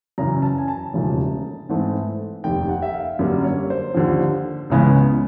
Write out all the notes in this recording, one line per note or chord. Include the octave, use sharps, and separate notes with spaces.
F#2 C#3 E3 A#5
A5
G#5
A5
E1 D#2 C#3 F3 A3
G#2 E3 A3 C4
F1 D#2 D#3 G5
F#5
E5
F5
F#2 D3 G3 A#3
C#5
C5
D#2 D3 F3
C#2 C#3 E3 G#3 B3